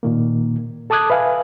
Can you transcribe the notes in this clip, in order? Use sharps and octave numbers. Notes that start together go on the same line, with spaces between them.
A#2 D#3 A#3
A4 A5 D6 D#6 F#6 G#6
B4 E5 F5 G#5